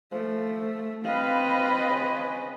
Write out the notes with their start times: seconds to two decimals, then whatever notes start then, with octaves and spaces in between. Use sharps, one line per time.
0.12 F3 A3
1.05 C4 F4 B4 D#5 F5
1.89 C#3